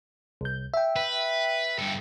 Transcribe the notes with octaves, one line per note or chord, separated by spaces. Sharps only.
C2 G6
E5 G5
B4
G2 A4